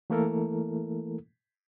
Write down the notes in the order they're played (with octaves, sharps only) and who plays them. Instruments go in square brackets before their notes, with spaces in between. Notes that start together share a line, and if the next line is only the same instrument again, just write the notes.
[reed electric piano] E3 A3 A#3 E4 A4 A#4